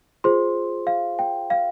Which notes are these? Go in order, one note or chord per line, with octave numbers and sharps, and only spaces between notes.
F4 G#4 C5 C6
F5
G5
F5